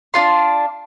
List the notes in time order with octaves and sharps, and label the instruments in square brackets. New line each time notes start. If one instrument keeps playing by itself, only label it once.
[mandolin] D4 F4 C6